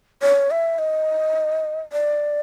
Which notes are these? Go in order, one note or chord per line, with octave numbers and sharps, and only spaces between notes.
C#5
E5
D#5
D5